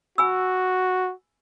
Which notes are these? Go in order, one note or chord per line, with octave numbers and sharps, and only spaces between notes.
F#4 G#5 B5 E6